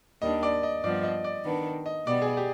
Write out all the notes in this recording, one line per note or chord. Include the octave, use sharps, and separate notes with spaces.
D#2 D#3 G3 D4 D#5
D5
D#5
G2 F3 B3 D5
D#5
D5
D#3 B3 D4
D#5
B2 G3 B3 D5
G#4
G4